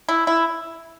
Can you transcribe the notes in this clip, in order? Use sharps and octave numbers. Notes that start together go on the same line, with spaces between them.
E4
E4